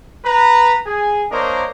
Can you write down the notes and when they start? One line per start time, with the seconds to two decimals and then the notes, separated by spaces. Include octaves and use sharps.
0.25 B4 A#5
0.87 G#4 G#5
1.31 A#3 D4 A#4 C5 C#5 D#5